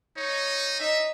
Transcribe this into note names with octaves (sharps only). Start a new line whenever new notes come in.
D#4 C#5
D#4 E5